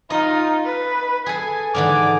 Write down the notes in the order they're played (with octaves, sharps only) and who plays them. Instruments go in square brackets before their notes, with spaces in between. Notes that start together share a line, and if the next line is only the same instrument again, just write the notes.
[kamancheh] D#4 F4 [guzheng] D#5
[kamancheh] B4
[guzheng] G#4 A4 [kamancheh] G#5
[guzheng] G#2 D3 E3 [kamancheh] D6